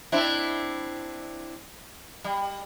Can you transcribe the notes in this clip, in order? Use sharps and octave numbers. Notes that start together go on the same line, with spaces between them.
C4 D4 E4
G3